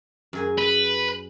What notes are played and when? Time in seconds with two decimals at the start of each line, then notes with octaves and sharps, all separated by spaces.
0.33 F#2 G#4 G#5
0.58 B4